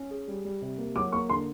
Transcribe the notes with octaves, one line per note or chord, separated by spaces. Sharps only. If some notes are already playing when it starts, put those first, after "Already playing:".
Already playing: C#4
G#4
G3
G3
C3
A#3
F#3 D6
A#3 C#6
D3 C6